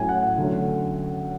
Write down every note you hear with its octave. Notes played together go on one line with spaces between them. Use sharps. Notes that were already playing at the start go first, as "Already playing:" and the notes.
Already playing: A2 F#3 C#4 G#5
F#5
F#5
D3 F#3 A3 C#4